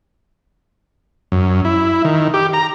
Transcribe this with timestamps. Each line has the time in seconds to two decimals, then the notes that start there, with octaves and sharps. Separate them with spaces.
1.32 F#2
1.65 E4
2.05 D#3
2.34 G4
2.53 A#5